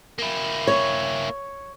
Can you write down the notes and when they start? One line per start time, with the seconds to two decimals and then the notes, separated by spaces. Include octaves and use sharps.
0.18 A#3 E4
0.67 C#5